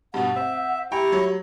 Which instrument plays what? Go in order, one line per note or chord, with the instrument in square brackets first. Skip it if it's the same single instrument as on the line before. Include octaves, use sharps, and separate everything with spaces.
[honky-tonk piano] G2 B2 [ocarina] F#5
[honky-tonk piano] C4 [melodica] E5
[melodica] E4 A#5 C#6 [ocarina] G4 [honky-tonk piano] G5
[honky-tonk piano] F#3 C#5